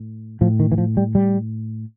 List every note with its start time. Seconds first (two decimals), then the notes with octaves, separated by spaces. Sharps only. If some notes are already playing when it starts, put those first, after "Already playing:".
Already playing: A2
0.41 A2 F3
0.60 D#3
0.72 E3
0.78 F3
0.97 G3
1.15 G3